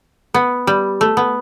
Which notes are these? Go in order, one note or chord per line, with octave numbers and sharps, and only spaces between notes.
B3
G3
A3
B3